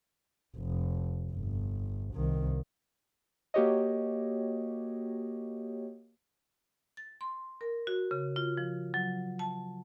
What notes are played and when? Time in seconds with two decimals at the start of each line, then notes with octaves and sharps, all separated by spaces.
0.57 F1
1.32 G1
2.14 C2 D#3
3.54 A#3 F#4 G4 C#5 D#5
6.97 A6
7.21 C6
7.61 A#4
7.87 F#4
8.11 C#3
8.36 F4
8.57 F3
8.94 F#3
9.39 A5